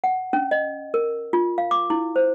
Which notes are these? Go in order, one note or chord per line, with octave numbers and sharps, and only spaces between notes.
F#5
C#4
D#5
A#4
F4
F5
D6
E4
C5